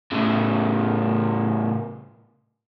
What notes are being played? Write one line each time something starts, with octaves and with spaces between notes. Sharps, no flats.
A2 C#3